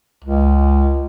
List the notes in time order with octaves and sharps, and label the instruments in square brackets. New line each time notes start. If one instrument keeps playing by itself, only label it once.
[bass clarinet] C#2